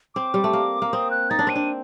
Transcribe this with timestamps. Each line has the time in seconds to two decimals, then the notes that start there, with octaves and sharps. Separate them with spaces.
0.15 C4 D6
0.34 G3
0.44 A3
0.53 A#3
0.82 A#3
0.93 C4 D#6
1.11 F#6
1.30 D#4 A6
1.39 D4
1.47 C4 D#7
1.56 D4